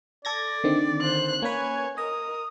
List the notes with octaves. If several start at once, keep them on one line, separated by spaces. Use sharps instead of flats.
A4 D5 G#6 A#6
D3 D#3 C4
C5 F#6
A#3 C#4 B4 C#5 G#5
A#4 D#5 D#6